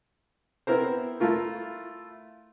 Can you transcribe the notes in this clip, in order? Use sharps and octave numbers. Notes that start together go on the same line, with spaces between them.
B3 C4 E4 A#4 C5
A3 E4 F4 A#4